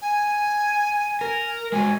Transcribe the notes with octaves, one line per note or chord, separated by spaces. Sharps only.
G#5
A#4
G#3 F#4 G#5